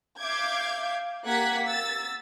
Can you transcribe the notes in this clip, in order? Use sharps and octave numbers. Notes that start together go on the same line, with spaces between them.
E5 F5 D6 G6 G#6
A#3 G4 F#5 F#6 G#6 B6
E6 A6